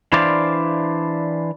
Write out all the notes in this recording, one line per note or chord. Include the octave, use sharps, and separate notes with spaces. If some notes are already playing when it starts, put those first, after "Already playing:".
E3 D4 E4 C5 D5 F5